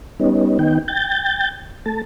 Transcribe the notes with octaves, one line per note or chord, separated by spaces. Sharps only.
G3 B3 C#4 D#4
D#3 B3 D#4 G5
G5 G6 A6
A3 A5